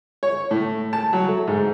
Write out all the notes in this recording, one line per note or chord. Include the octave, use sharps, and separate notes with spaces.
C#5
A2
A5
F#3
A3
G#2